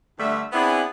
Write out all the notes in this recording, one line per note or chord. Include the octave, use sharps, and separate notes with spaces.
G2 D3 G3 A3 E5
B3 C4 D4 E4 G#4